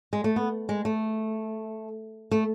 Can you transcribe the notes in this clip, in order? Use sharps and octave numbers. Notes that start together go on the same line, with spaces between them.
G#3
A3
B3
G#3
A3
A3